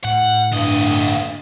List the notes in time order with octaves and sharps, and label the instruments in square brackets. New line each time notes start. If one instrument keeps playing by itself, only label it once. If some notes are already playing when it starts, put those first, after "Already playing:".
[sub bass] A2 [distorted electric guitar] F#5
[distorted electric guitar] D2 D#5 [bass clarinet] G2